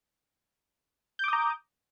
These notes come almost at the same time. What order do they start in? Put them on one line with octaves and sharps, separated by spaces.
G6 D6 D#6 A#5